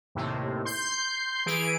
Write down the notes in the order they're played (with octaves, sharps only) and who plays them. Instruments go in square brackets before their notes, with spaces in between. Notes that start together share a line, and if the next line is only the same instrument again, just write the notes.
[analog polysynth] D#2 A2 C3
C6 G6 C7
E3 G#4 D7